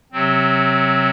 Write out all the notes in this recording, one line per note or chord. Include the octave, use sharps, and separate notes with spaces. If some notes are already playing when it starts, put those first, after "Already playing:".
C3 F#3 C4